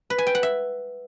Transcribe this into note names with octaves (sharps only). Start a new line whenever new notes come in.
B4
G#5
G5
F#5
E5